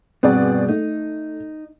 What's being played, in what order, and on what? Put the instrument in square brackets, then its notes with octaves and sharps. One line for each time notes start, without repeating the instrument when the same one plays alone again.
[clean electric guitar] G2 B2 B3 [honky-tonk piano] C4 G#4 D5
[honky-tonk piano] A3 [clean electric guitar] D#4